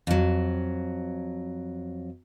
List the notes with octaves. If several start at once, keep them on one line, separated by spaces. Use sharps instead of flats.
F2 F#3